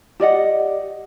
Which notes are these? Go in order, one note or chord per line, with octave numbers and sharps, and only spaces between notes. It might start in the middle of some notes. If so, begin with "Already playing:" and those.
G4 D5 D#5 F#5